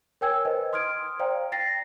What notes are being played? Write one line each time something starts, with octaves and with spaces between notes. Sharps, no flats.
A#4 C#5 G5 G#5 E6 G#6
B4 C5 D#5
C6 D#6 F6 G#6 D7
C5 D5 F5 G5 A#5
G5 A6 A#6 C7